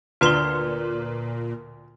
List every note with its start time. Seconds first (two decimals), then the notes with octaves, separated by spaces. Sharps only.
0.21 D2 A#2 F4 B4 C6 F6 G7